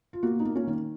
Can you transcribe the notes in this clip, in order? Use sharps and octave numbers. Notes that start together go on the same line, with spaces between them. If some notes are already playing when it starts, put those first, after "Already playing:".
F4
A#3 F#4
D#4
A#3
C#4
D#3